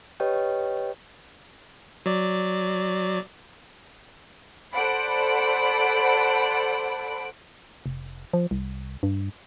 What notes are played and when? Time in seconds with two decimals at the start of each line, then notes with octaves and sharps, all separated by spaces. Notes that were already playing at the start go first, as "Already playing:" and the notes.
0.20 G4 B4 C#5 D#5 G5
2.06 F#3 D5
4.73 A4 C5 D5 F#5 B5 D7
7.86 F1
8.33 F3
8.51 C2
9.03 G2